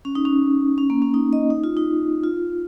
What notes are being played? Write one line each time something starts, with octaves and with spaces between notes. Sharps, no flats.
C#4
D#4
C#4
C#4
A#3
C#4
D#4
D#5
D#4
F4
D#4
F4